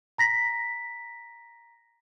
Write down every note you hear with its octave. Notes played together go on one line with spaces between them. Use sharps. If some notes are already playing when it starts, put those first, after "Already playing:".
A#5 A#6 B6